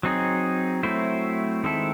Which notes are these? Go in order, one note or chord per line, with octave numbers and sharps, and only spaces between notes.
F#3 C4 D#4 G#4
F#3 A3 C4 E4 C5
D#3 G#3 C4 E4 A4